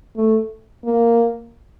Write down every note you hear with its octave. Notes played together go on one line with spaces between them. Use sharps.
A3
A#3